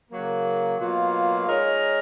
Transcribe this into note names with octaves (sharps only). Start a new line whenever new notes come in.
C#3 F#3 A#3
B2 F#3 A#3 F4
G#3 D#4 A#4 C#5